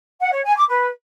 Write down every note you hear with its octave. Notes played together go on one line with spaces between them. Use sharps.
F#5
C#5
G#5
D6
B4